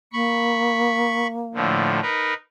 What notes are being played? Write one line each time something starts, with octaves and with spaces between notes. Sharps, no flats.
A#3 B5 C#6
A2 D3 F3
D#4 A#4 B4